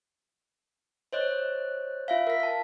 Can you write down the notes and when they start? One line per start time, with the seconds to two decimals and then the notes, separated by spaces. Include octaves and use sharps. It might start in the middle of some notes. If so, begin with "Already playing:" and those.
1.13 C5 C#5 D#5 F#6
2.08 F4 E5 F5
2.27 A#4 B6
2.40 F5 A5